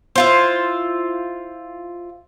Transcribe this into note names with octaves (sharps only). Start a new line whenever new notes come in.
E4 F4 C5